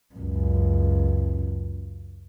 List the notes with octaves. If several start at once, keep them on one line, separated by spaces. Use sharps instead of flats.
C#2 F#2